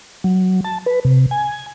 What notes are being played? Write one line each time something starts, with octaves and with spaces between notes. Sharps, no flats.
F#3
A5
B4
C3
G#5